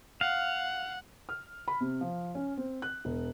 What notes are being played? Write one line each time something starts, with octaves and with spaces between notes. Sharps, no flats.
F5 F#5
F6
B5
C3
F3
C#4
C4
F#6
E1